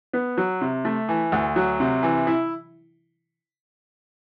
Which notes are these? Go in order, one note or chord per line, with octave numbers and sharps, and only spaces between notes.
B3
F#3
C3
A3
E3
D2
F#3
C3
E3
E4